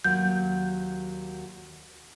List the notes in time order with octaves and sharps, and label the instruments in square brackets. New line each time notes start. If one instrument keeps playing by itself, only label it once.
[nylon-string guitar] D#2 F#3 [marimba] G6